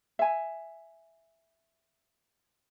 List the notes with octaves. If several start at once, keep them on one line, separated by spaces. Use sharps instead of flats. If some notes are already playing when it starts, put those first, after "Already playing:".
E5 G#5